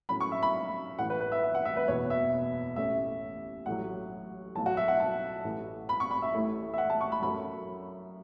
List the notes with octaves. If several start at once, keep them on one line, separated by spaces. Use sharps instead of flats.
A2 F#3 C#4 B5
C#6
E5
B5
A1 A2 E3 F#5
B4
B4
E5
E5
F#5
E5
B4
F#1 E2 B2 C#5
E5
A1 A2 A3 C#4 E5
A1 A2 F#3 F#5
B1 A2 F#3 A5
F#4
E5
F#5
A5
A1 A2 E3
B5
C#6
B5
E5
A1 A2 A3 E4
E5
F#5
A5
C#6
B5
F#2 F#3 A3 B5